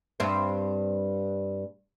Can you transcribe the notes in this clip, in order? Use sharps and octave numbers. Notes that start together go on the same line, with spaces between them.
G2 C4